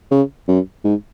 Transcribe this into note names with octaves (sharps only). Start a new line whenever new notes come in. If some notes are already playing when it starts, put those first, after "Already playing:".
C#3
F#2
G#2